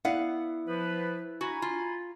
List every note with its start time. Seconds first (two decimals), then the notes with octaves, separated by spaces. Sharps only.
0.05 B3 E4 D5 F5 F#5
0.67 F3 B4
1.41 F#4 G#5 A#5 B5
1.62 F4